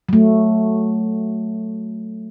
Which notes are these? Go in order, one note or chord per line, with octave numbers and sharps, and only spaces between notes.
F#3 A3